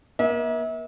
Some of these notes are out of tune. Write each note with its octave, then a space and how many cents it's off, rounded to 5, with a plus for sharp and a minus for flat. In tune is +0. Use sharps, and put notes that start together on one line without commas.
A#3 +40 E5 -35